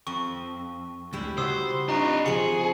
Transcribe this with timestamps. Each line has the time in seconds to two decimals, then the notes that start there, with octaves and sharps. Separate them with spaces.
0.07 F2 C#6
1.13 D2 G3 G#3 D4 E4 B5
1.38 C#3 F#4 C5 E5 D#6 E6 C7
1.89 D4 D#4 F4 G4 B4 A#5 C#6
2.26 C#3 F3 C4 F4 G#4 C#7 F#7